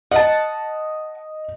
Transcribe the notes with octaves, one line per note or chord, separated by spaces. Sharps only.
D#5 F#5 A5